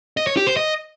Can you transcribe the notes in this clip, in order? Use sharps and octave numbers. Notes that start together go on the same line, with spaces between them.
D#5
C#5
G4
C5
D#5